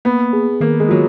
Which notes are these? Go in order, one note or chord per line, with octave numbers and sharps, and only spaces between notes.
A#3 B3
G#4
D#3 A#3
G#3
F#3 F4